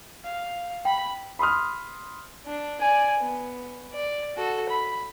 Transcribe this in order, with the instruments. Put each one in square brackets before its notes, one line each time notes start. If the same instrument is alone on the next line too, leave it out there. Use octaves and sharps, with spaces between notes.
[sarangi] F5
[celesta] G5 [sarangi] B5
[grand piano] B5 C6 D#6 F6
[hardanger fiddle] D4
D5 G#5
B3
D5
F#4 A4
B5